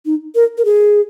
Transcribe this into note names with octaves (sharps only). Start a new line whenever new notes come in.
D#4
A#4
A#4
G#4